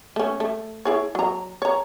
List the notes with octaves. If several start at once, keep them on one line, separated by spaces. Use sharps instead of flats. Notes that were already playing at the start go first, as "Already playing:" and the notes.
A3 C#4
A3
E4 G#4 C#5
F#3 A#5
C#5 A#5